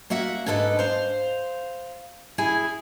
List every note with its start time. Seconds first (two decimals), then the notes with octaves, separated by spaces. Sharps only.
0.10 A#3 F#4 E5 F#5
0.46 G#2 D4 A4 B4 D#5
0.79 C5 F5
2.38 E4 G#4 G#5